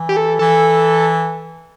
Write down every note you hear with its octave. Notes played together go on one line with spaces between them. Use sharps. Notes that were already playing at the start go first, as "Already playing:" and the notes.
Already playing: E3
G4
A4
E3 A4